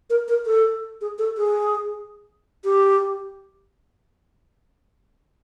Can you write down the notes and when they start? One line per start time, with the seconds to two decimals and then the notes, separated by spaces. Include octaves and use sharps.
0.10 A#4
0.28 A#4
0.46 A4
1.01 G#4
1.18 A4
1.37 G#4
2.64 G4